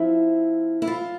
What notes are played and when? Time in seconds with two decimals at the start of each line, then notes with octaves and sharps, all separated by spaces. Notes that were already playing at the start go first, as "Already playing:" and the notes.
Already playing: F3 C4 E4
0.82 E4
0.87 F4